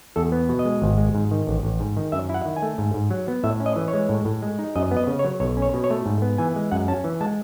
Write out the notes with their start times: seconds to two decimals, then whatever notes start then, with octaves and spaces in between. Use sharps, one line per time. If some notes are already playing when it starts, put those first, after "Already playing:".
0.16 E2 A4
0.32 B3
0.49 B2
0.59 D#5
0.65 G#3
0.82 G#1
0.97 G#3
1.15 G#2
1.31 D#3
1.47 A1
1.63 A1
1.80 G#2
1.97 D#3
2.12 F#2 E5
2.29 E4 F#5
2.45 D#3
2.56 G#5
2.62 A3
2.78 G#2
2.94 G#2
3.10 F#3
3.28 B3
3.44 A2 E5
3.60 C#4
3.66 D#5
3.76 E3
3.88 C#5
3.94 G#3
4.09 A2
4.25 A2
4.42 G#3
4.59 D#4
4.76 F#2 D#5
4.91 B3
4.97 D#5
5.07 C#3
5.19 C#5
5.24 F#3
5.40 B1 C#5
5.57 C#4
5.62 C#5
5.74 B2
5.84 C#5
5.90 A3
6.06 G#2
6.22 B3
6.38 E3 G#5
6.56 G#3
6.72 F#2 F#5
6.88 C#4 A5
7.04 E3
7.21 G#3 A5